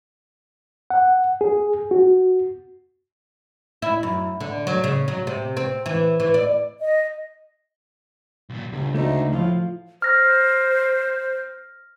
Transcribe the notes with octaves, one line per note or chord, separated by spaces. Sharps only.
F#5
G#4
F#4
E4
F#2
D3
F#3
C#3
F#3
C3
C4
E3
E3
D5
D#5
B1 A#2
G1 C#2
D2 A3 D#4
A2 F3 F4
C5 F6 A#6